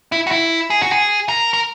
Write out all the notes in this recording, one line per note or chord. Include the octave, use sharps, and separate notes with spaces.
E4
F#4
E4
G#4
F#4
G#4
A#4
A#4